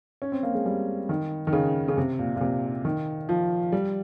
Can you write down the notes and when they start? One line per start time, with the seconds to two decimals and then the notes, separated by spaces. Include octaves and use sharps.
0.22 C#4
0.32 C4
0.43 A#3
0.55 G#3
0.66 G3
1.09 D#3
1.47 D#3
1.53 C#3
1.88 C#3
1.97 C3
2.19 A#2
2.36 A#2
2.41 C3
2.85 D#3
3.29 F3
3.72 G3